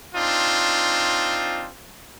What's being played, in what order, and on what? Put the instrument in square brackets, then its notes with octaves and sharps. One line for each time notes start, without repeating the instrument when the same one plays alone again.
[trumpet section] C4 D4 D#4 F4